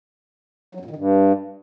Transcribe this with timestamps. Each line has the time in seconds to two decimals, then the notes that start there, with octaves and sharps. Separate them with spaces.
0.75 F#3
0.80 F#2
0.85 A#2
0.91 D#3
0.96 G2